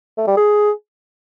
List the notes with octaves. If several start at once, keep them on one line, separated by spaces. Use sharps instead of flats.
A3
G3
G#4